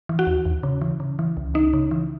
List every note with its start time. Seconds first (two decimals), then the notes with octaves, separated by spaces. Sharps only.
0.09 E3
0.19 F#4
0.27 D#2
0.45 D#2
0.63 C#3
0.82 E3
1.00 C#3
1.19 E3
1.37 C#2
1.54 C#2 D#4
1.74 C#3
1.91 E3